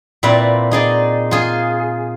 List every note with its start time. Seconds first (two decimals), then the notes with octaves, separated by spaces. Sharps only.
0.23 A#2 C4 E4 B4 D5
0.71 D#4 G#4 D5
1.31 F4 G#4